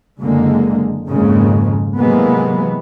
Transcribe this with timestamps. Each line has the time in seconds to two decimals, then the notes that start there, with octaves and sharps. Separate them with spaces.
0.22 F#1 D3 G#3 A#3
1.09 G#1 F2 G#2 C#3 G#3 A#3
1.97 C3 E3 F#3 G#3 A#3 B3